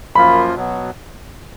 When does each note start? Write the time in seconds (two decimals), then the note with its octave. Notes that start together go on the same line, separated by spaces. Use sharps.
0.15 F#2 F3 A#3 F4 B5
0.55 B2 F#3 B3